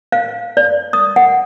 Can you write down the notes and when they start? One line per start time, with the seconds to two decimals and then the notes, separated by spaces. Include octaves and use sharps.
0.12 F5
0.57 D5
0.93 D#6
1.16 F#5